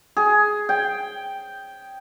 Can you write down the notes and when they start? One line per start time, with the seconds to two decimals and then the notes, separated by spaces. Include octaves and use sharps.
0.16 G#4
0.69 G5